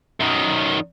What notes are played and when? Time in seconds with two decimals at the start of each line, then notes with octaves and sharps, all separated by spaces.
0.20 F#2 D#3